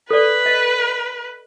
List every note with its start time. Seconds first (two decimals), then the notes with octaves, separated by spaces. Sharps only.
0.11 A4 B4 D5
0.46 D#5